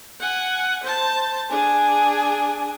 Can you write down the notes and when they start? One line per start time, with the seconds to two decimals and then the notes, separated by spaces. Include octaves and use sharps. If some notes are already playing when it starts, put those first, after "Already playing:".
0.20 F#5 G#5
0.83 C5 A5
1.50 D4 G#4 G#5